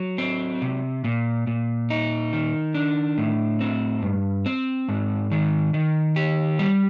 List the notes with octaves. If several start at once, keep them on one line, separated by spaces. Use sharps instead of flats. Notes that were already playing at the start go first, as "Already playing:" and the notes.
Already playing: F#3
C4
C3
A#2
A#2
D#4
D#3
D4
A2
C4
G2
C4
G#2
D#3
D#3
G4
G3